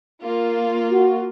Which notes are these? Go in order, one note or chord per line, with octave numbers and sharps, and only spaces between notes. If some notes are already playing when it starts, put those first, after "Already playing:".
A#3 F4
F#4